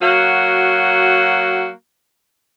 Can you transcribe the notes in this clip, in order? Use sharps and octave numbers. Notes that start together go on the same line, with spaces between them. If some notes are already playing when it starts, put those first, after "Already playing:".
F#3 A#3 F#4